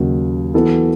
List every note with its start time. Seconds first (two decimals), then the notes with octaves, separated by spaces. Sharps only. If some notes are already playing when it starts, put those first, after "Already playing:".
Already playing: D#2 C#3 F#3
0.54 E3 B3 F#4 A4